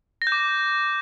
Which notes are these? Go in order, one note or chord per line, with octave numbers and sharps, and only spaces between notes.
A#6
G6
D6